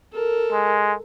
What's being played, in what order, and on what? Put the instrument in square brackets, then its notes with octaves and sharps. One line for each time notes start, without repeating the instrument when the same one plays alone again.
[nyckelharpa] A4 A#4
[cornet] G#3